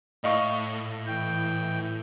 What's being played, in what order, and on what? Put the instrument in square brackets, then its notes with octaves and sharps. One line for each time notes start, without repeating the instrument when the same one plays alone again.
[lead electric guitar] A2 [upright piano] D#5 F5 C#6
[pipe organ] E3 G5